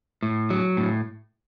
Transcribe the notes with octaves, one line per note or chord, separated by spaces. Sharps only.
A2
F#3
A2